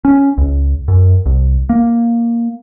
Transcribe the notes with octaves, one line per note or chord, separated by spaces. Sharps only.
C#4
C#2
F#2
C2
A#3